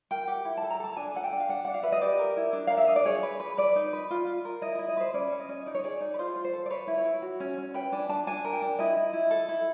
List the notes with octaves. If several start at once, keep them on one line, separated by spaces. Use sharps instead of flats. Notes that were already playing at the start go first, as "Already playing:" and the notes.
A#4 G5
G4 F#5
E4 G5
A5
A4
A#5
A4 A5
A5
D4 G#5
A4 F#5
G5
D4
F5
D4 F#5
D4 F#5
F5
B4 E5
D#5
G4 D5
A#4
E4
D4
A#4 F5
E5
D4 D#5
D5
G#4 C#5
B4
B4
B4 D5
D#4
B4
F4
F4
A#4
E4 D#5
E4 D#5
D#5
B4 C5
C#4 D5
C#4
D#5
C#4
D#4 D5
C#5
G#4 D5
D#4
B4
F4 C5
F4
C5
A4
D5
B4 C#5
E4
C#5
E4
F#4
C#4
C#4
B4 G5
D4 G#5
D4 A5
D4 G#5
A#4
G5
D4
E4 D#5
E4
E4
A4
E4